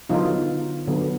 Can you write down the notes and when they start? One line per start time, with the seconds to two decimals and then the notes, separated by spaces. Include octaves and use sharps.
0.09 D3 F#3 B3 D#4 F4
0.88 D3 F#3 B3